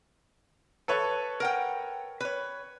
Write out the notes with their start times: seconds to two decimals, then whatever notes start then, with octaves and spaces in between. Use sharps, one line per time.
0.88 A4 B4 C#5
1.40 A#4 F#5 G5
2.20 B4 C#5